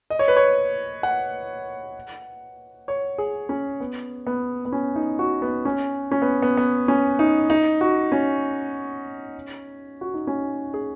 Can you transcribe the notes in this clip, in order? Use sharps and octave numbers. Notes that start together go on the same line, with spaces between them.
D#5
C#5
B4
C#5
F#5
C#5
G#4
C#4
B3
B3
B3
C#4
D#4
F#4
B3
C#4
C#4
B3
B3
B3
C#4
D#4
D#4
F#4
C#4
F#4
D#4
C#4
G#4